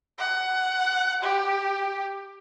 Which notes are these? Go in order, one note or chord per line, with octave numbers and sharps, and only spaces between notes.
F#5
G4